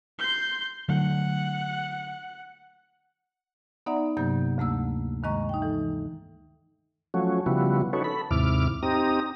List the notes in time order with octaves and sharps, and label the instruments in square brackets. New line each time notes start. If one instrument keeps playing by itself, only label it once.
[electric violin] C6 G6
[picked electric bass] D3 F#3 A3 [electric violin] F#5
[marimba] B3 D#4 D5 E5 F#5 A#5
G2 C3 F#3 A#3 G6
D2 A3 A#3 E6
G2 D#3 G#3 D#5 A#5 C#6
D#4 G5
E3 A4
[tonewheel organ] F3 F#3 A3 C#4 F#4
C#3 F3 G3 B3 E4 F#4
C#4 D#4 F#4 A4 B4 C#5
A4 B5
D#2 G#2 C3 E4 D6 F6
C4 D#4 G4 A#5 D#6